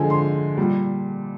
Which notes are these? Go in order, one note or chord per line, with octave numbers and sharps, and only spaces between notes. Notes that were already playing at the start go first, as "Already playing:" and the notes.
Already playing: D3 F3 G#3 G#5
C6
A#2 G3